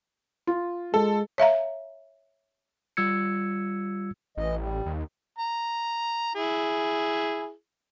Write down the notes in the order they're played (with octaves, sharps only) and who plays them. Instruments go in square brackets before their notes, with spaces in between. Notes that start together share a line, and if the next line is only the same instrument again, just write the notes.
[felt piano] F4
[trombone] G#3 [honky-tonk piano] A4
[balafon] C#5 E5 F5 A#5
[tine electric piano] G3 F4 E6 G#6 C#7
[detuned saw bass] A1 [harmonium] E3 D#5
[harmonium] G3
[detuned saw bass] D#2
[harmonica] A#5
E4 G#4